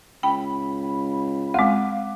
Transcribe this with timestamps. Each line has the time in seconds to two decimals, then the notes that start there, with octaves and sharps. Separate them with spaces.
0.23 C#2 G5 B5
1.54 G#3 C4 F5 F#5 D6